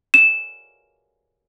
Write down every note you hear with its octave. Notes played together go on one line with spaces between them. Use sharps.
E7